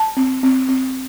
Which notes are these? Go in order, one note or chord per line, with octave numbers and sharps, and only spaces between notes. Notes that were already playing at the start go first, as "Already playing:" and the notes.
Already playing: A5
C4
C4
C4